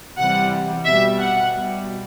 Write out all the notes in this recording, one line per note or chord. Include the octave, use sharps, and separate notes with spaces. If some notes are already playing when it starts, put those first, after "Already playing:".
C3 E3 G3 F#5
B2 G3 E5
F#5
B2 G3